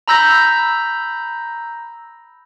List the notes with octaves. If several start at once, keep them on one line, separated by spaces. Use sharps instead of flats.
A#5 B5 E6 G6 A#6